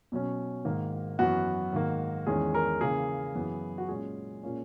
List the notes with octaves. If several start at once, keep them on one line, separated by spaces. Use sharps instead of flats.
B2 F#3 C#4
G#2 D#3 A#3
F#2 E3 B3 F#4
G#2 D#3 A#3
E2 D#3 G#3 C#4 G#4
A#4
C#3 E3 A#3 G#4
F#2 E3 B3
F#4
A#2 G#3 C#4 G#4
A#2 A#3 C#4